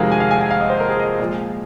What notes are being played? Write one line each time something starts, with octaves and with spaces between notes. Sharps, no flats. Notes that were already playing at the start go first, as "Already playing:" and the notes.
Already playing: F2 C3 D#3 G#3 F#4 G#4 A#4 F5
G#5
F5
G#5
G#5
F5
D#5
C5
A#4
G#4
D#5
A#2 F3 G#3